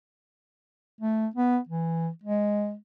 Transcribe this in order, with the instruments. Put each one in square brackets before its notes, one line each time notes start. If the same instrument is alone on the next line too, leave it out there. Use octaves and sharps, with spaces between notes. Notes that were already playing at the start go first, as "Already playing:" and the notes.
[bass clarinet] A3
B3
E3
G#3